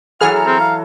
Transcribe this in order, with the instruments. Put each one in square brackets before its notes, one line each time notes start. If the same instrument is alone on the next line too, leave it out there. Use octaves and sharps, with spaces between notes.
[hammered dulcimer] E3 F#3 A4 [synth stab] G#4 F6 [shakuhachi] F#5
[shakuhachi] A#5
[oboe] C4
F5